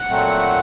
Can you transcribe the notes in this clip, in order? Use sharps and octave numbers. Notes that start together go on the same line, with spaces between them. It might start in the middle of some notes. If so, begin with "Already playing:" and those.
Already playing: F#5
A#2 F#3 A3 C4